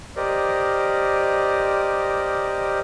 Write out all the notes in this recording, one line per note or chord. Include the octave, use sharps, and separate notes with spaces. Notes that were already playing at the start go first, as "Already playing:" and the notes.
G4 A#4 C5 D5 D#5